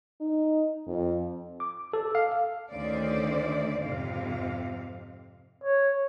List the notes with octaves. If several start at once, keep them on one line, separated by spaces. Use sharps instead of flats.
D#4
F2
D6
A4
F5
D2 D#3 A3 C#4 C5 D5
F2 G#2 C3 F5
C#5